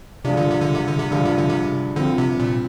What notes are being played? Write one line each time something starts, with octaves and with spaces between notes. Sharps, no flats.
G2 C3 F3 G#3 D4 F4
D3
C3
D3
C3
D3
C3
G2 D3 F3 G#3 D4 F4
C3
D3
C3
G2 D3 F3 C4
C3
A#2